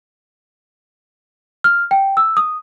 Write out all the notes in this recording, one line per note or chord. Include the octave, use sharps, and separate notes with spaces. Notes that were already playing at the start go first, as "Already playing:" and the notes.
F6
G5
E6
D#6